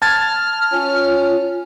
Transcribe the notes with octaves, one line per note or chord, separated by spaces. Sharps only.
A5 F6 G#6 A6
C#4 F4